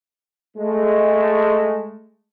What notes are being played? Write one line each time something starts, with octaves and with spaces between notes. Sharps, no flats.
G#3 A3